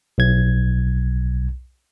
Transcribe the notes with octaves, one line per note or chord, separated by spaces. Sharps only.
B1 G#6